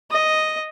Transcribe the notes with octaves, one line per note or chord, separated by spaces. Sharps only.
D#5